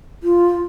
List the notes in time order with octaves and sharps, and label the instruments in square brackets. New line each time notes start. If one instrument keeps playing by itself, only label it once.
[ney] F4